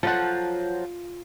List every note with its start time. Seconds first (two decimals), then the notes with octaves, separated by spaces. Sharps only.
0.03 F3 F#3 F4 A4 F#5